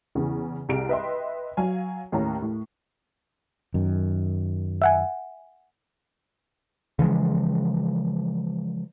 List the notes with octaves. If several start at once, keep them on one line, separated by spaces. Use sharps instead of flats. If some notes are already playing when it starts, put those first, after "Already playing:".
E2 C#3 E3
C2 C3 G#4 D7
B4 D#5 E5 G5 C6
F#3 F5 G#5
D#2 A2 C#4 A#5
A2
F#2 D#3
E5 F#5 G#5
C#3 E3 F3 G#3